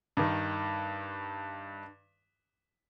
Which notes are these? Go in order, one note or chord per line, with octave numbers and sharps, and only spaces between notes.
G2 D#3